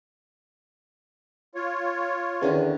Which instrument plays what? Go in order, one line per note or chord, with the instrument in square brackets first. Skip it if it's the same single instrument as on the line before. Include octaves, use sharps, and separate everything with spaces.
[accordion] F4 C#5
[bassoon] E2 [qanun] D3 D#3 C#4